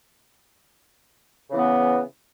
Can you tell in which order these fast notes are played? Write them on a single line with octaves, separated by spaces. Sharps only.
C#3 E3 B3